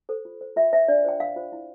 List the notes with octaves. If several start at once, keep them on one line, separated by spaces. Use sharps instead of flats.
A4 C5
F4
C5
F4 E5
C5 E5
D4 D5
F4 C5 G5
D4 F5
F4 C5
E4